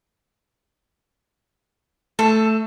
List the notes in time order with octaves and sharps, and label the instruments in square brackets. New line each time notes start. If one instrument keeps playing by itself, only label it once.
[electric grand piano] A3 [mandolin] A4